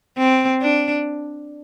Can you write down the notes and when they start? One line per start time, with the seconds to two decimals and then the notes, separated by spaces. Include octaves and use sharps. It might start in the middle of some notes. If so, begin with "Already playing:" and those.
0.18 C4
0.61 D4